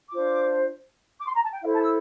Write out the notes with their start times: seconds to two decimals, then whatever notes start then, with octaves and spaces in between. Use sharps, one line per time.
0.10 D4 F4 C5 D6
1.19 D6
1.24 C6
1.34 A#5
1.43 A5
1.52 G5
1.62 E4 A4 C5 F5
1.72 A5
1.81 E6